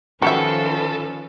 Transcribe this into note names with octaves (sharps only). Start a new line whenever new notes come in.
D#3 F3 C#4 F#4 G4 A4 B4 E5